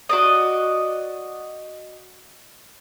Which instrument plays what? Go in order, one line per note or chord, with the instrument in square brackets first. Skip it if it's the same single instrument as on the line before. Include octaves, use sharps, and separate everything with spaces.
[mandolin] F#4 D5 D#5